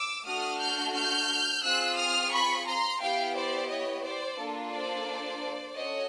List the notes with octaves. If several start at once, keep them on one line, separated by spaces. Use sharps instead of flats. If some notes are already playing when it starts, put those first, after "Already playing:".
Already playing: D6 E6
A3 D4 F#4 A4 D#6 F6
F6 G6
F6 G6
C4 F4 G#4 E6 F#6
D#6 F6
B5 C#6
A#5 C6
B3 E4 G4 F5 G5
C5 D5
C#5 D#5
C5 D5
A#3 D4 F4 A4
C5 D5
C#4 F#4 A4 C#5 D#5